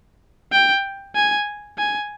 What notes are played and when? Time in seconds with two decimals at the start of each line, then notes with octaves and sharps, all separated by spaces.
0.52 G5
1.16 G#5
1.78 G#5